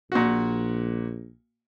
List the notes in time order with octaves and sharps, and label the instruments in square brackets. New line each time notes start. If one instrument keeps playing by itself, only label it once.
[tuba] A#1 [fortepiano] A#2 F#4